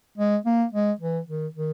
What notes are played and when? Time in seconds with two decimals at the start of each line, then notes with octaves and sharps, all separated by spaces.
0.18 G#3
0.46 A#3
0.73 G#3
1.00 E3
1.28 D#3
1.55 D#3